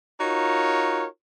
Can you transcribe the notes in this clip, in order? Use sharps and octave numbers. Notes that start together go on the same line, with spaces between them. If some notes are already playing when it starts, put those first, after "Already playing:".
D#4 F4 F#4 A#4 C#5